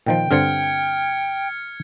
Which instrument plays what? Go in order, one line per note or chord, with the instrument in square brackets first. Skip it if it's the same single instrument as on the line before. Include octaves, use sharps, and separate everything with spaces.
[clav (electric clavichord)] A#2 D#3 F3 [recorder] G5
[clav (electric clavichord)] G2 D3 C4 [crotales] F6 G#6 C#7